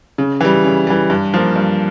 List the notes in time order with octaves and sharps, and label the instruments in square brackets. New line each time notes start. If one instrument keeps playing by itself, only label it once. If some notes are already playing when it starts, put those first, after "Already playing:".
[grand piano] C#3
E3 G3
C#3
E3 G3
G2
F3 A#3
G2